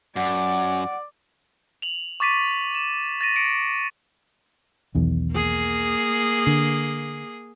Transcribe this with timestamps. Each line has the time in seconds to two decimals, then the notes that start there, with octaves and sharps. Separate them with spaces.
0.16 F#2 D5 F#5
1.82 F7 F#7
2.20 C#6 D6 A6 B6 D#7
2.75 E7
3.21 A6 A#6 D#7
3.36 A#6 C#7 D7
4.95 B1 E2 D#3
5.32 A#3 G#4
6.47 D3